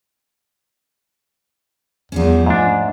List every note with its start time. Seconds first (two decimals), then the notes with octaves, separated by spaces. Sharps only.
2.12 E2 F3 G3 C#4
2.46 G#2 A3 D4